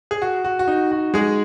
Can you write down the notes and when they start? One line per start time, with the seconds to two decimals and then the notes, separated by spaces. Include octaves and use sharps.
0.11 G#4
0.22 F#4
0.45 F#4
0.59 F#4
0.68 D#4
0.91 F#4
1.14 G#3 G#4